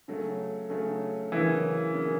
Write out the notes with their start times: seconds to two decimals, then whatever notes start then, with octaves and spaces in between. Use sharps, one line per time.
0.08 C#3 F#3 A3
0.70 C#3 F#3 A3
1.32 C#3 E3 F#3 A#3
1.94 C#3 F#3 A#3